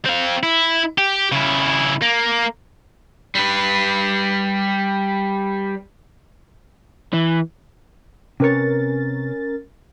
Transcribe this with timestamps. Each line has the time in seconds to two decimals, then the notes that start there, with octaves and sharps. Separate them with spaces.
0.05 C4 F5
0.43 E4
0.98 G4
1.32 C#3 E4
2.02 A#3
3.35 G3 B4
7.13 E3
8.40 C3 C#4 A#4 B4 C#5 A6